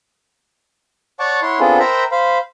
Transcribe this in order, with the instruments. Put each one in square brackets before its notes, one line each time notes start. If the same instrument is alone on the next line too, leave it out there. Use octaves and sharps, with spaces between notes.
[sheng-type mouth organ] C#5 D5 F#5 A5 C#6 D6
E4 C#5 F#5 C6
B3 C4 D4 F4 G#4 A4
A#4 C5 E5 G5 A#5 B5
C5 F5 B5